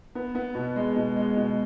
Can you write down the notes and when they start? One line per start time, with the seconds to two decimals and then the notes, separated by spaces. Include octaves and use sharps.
0.15 B3
0.35 B3
0.55 B2
0.76 G#3
0.96 B2
1.16 G#3
1.37 B2